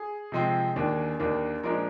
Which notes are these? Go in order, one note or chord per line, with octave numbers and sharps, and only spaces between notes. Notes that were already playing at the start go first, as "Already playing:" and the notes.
Already playing: G#4
C3 F3 G#3 C4
D#2 D#3 A#3 D4
D#2 D#3 A#3 D4
A#2 F3 G#3 D4 A#4